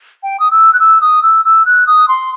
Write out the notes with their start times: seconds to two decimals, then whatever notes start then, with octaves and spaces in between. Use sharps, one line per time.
0.23 G5
0.40 D#6
0.51 E6
0.73 F#6
0.80 E6
1.01 D#6
1.22 E6
1.45 E6
1.66 F#6
1.87 D#6
2.08 C6